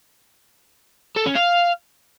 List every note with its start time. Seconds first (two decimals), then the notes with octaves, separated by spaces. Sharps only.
1.16 A4
1.26 C#4
1.35 F5